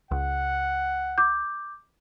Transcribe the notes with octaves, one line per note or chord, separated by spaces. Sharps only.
C#2 F#5
D6 G6